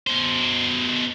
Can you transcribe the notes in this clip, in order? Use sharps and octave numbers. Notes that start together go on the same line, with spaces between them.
B2 C5